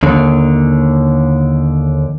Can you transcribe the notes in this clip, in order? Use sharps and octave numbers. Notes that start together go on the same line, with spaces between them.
D#2 D3